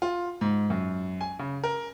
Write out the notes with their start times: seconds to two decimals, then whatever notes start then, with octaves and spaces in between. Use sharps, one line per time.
0.02 F4
0.41 G#2
0.70 F#2
1.21 G#5
1.39 C#3
1.64 A#4